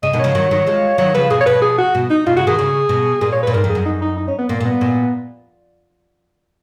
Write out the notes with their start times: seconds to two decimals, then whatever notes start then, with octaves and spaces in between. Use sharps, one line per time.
0.03 C#3 D#5
0.13 B2 D#3
0.20 C#3 F3 C#5
0.35 D#3 F#3
0.51 D#3 F#3
0.67 F3 G#3
0.98 D#3 F#3 C#5
1.15 C#3 F3 B4
1.30 B2 G#4
1.41 C#5
1.46 B2 B4
1.62 G#4
1.78 F#4
1.95 B2
2.10 D#4
2.26 B2 F4
2.36 C#3 F#4
2.47 B2 D#3 G#4
2.59 C#3
2.89 B2
3.21 A#2 G#4
3.33 C#5
3.43 A#2 B4
3.54 G#2 A#4
3.64 F2
3.69 G#4
3.75 F#2
3.85 D#4
4.02 D#4
4.17 D#4
4.28 C#4
4.38 B3
4.49 A#2 A#3
4.60 A#2
4.65 B3
4.81 A#2